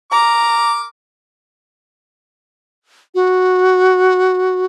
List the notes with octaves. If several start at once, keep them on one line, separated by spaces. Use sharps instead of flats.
A#4 A#5 D6
F#4